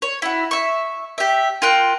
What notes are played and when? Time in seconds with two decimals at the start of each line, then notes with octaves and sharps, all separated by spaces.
0.02 C#5
0.22 E4 F#4
0.51 E5 C#6
1.18 G4 E5
1.62 F4 A#4 G5 F#6